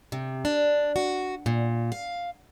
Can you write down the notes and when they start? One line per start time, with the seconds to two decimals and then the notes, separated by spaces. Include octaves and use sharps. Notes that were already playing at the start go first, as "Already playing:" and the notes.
0.12 C3
0.45 D4
0.96 F#4
1.46 A#2
1.92 F5